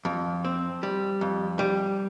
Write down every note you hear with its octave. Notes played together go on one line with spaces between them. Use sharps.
F2
C4
G3
F2
G3